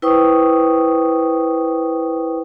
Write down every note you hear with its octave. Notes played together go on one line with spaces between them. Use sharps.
E4 B4 C5 G5 C#6 D#6